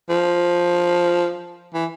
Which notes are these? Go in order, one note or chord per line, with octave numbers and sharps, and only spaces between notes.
F3
E3